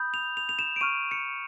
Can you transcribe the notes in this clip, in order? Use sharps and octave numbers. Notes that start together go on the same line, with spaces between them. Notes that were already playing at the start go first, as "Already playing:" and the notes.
Already playing: B5 D#6 G6
F7
F7
F7
E7
D7
C#6 F6 D#7
C#7